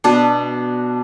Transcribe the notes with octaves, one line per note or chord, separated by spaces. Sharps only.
B2 B3 D4 B4